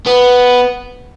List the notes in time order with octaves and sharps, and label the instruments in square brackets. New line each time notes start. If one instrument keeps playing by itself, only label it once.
[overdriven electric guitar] B3